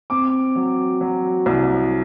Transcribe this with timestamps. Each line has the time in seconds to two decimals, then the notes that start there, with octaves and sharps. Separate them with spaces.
0.10 C4 D6
0.56 F#3
1.01 F#3
1.46 C2